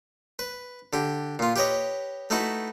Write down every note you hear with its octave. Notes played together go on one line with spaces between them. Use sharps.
B4
D3 G4
A#2 F4
G4 B4 C#5 D#5
A3 D#4 E4 F#4 B4